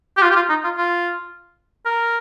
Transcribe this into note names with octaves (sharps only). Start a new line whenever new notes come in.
G4
F4
G4
F4
D#4
F4
F4
A#4